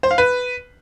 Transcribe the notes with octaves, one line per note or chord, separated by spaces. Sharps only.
C5
F5
B4